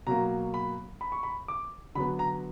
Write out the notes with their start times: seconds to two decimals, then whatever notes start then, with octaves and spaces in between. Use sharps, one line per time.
0.07 B2 F#3 A#3 A#5
0.54 B5
1.01 B5
1.12 C#6
1.23 B5
1.48 D6
1.95 D3 F#3 B3 B5
2.19 A#5